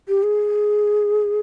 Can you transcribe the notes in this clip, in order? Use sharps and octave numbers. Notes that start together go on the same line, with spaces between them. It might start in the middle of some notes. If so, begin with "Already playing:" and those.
G4
G#4